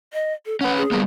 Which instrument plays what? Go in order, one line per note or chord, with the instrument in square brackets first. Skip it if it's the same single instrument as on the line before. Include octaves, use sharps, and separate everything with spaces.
[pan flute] D#5
A4
[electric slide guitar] C#4 B4 [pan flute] F#5
[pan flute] G#4
[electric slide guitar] G3 A#3 B3